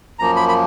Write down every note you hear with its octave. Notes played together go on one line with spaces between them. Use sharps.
F#2 F3 A#3 A#5
B5
B5